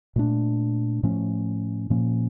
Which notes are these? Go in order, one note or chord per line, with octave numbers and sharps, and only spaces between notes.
A#2 A3 D4
A2 F3 A3 C#4
A#2 F3 A#3 C#4